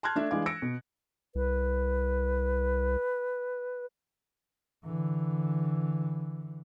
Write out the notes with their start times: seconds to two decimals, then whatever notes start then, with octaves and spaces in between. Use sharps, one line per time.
0.03 A5 C6 F6 F#6 G#6
0.15 A3 D4 E5
0.31 E3 G#3 D4 E4 F5 D6
0.46 E6 A#6 C#7 D7
0.62 B2
1.35 C2 B4
4.85 D3 E3